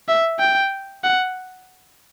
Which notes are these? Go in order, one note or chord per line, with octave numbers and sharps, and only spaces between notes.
E5
G5
F#5